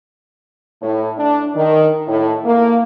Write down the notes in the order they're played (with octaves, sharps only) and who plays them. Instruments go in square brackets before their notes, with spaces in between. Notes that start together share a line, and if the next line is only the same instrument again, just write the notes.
[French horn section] A2
D4
D#3
A2
A#3